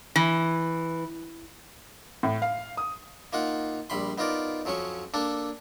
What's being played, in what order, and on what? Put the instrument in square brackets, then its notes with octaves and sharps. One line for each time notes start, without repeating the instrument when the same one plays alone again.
[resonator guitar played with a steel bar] E3
[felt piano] A2
F5
D#6
[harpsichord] A#3 D#4 F4 F#5
A#1 G3 B5 C6
B3 D#4 F4 A#4 D5
F2 F3 F#3 C#4 C#6
A#3 D4 A4